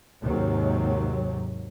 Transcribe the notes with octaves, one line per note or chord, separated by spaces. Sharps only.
D#2 G#2 C3 F#3